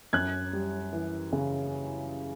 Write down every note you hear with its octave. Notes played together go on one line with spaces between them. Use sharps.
F#2 F#6 G#6
G3
E3
C#3